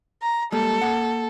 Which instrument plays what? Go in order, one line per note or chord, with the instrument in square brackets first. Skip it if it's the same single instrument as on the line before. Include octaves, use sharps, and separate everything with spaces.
[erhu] A#5
[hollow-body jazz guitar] G3 G#3 A#3 [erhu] A4
[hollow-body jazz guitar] A#3 F#5